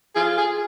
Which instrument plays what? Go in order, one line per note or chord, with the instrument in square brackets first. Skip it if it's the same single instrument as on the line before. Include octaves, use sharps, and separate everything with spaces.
[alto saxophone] F4 [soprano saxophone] G#4
[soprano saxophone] G#4